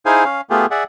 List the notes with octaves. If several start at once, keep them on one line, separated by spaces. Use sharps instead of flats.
D#4 E4 G#4 C5 F5 G#5
C#4 F5
A3 B3 F4 G4 G#4
G#4 D5 E5 F#5